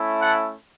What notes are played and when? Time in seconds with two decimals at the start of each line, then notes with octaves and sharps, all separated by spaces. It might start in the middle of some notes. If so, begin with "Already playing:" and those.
Already playing: A3 C#4 E4
0.19 F#5 A5